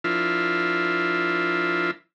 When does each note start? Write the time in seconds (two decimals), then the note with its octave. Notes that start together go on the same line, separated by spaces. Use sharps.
0.04 F3 D4 E4 F4 A#4 E5